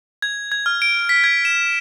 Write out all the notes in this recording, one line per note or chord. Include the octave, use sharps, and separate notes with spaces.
G#6
G#6
F6
D7
B6
G#6
E7